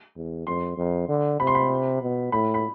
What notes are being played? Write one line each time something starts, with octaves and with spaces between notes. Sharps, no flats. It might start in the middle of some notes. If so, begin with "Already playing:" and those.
E2
F2 C6
F2
D3
C3 B5
C6
B5
B2
A2 B5
B5